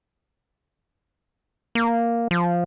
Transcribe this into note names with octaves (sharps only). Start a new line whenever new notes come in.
A#3
F3